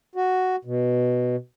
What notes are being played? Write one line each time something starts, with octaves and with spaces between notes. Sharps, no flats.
F#4
B2